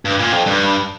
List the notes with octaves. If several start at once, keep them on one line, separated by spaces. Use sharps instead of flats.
G2
A#2
F2
G2